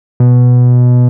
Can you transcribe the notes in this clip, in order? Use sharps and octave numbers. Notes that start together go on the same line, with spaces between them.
B2